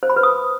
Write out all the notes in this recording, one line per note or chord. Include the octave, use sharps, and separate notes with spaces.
C5
B5
B4
D#6